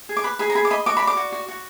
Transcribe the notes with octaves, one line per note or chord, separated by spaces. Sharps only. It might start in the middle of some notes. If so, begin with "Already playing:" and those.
G#4
D6
B4 B5
G#4 B5
A#5
G#4 B5
D6
D#5 B5
F#4 D6
B5
D5
D6
F#4
F#4
F#4